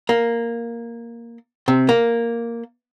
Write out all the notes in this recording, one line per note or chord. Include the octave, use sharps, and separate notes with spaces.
A#3
C3
A#3